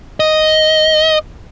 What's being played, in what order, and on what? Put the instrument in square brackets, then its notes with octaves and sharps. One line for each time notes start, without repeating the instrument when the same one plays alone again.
[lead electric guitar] D#5